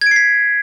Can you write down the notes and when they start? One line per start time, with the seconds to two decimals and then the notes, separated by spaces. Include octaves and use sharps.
0.01 G#6
0.06 D7
0.11 C7
0.16 B6